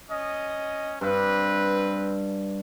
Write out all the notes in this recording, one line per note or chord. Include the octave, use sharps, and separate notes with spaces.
C#4 D#5
G2 C4 B4